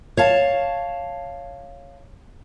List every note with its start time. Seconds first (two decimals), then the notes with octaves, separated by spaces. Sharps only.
0.17 C#5 F5 A5